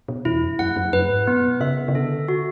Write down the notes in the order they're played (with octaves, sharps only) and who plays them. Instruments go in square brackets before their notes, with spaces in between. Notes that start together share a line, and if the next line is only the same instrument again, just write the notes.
[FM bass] B2
[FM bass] E2 [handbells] E4
[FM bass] F#2
[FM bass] F#2 [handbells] F#5
[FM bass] F#2
[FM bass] F#2 [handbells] B4
[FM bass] G#2
[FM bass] B2 [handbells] B3
[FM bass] C#3 [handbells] E5
[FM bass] C#3
[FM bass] D3 [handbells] A4
[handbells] F#4